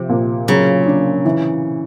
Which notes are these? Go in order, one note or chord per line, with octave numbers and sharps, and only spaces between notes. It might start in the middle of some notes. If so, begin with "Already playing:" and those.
Already playing: C3 F3
A#2
C#3 F#3
D4
E3